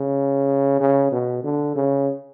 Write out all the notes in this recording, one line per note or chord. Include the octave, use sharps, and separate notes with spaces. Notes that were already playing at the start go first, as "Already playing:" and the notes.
Already playing: C#3
C#3
B2
D3
C#3